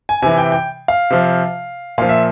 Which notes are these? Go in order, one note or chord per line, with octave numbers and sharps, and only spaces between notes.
G#5
C3 E3 G#5
G5
G5
F5
C3 F3
A#2 F3 F5
E5